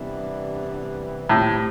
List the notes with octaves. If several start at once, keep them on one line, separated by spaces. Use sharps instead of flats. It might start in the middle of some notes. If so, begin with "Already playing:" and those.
Already playing: C3 E3 G3 B3 D4
A2 G3 C4 G4